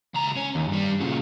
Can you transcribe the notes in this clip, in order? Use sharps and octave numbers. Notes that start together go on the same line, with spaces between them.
C#2 A#5
C#4
D#2
G2 G3
A#2 C#3